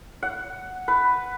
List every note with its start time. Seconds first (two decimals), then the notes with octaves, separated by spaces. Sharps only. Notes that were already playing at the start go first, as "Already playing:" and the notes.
0.23 F#5
0.88 B4